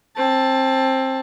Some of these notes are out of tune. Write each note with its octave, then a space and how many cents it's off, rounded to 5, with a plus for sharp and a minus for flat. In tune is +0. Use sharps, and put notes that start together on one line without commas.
C4 +20 A5 +0